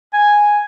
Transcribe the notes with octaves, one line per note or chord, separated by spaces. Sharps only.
G#5